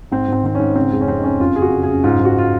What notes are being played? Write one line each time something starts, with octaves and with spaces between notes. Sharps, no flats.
G#2 C4
G#2 C4
D#3 C4
G#2 C#4
C#3 C4
F2 G#3
C#4
F2 C4
D#4
F2 C#4
F#2 F4
C#3 G#4
F#4
C#3
G#4
F#2
G#2 F4
G#2
F#4
F4